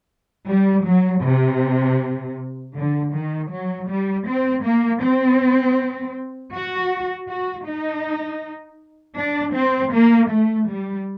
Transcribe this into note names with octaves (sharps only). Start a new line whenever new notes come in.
G3
F#3
C3
D3
D#3
F#3
G3
C4
A#3
C4
F#4
F#4
D#4
D4
C4
A#3
A3
G3